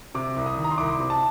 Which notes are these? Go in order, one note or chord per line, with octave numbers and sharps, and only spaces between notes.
C3 D6
C2
D#6
D#3
A#5
C6
C2 D6
C3
A5